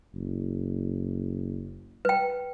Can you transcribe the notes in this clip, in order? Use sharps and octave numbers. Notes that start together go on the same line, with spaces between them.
F#1
B4 G5